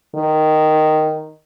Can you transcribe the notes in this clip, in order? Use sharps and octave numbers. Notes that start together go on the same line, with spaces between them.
D#3